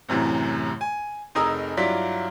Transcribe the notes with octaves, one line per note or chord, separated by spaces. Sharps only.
C2 F#2 A2 C3 E3
G#5
F1 D#4 G#4 A#4 D#6 E6
G2 F#3 E4 F4 D5 B6